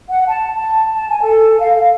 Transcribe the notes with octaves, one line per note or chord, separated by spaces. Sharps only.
F#5
A5
A5
A5
G#5
A4
F5
F5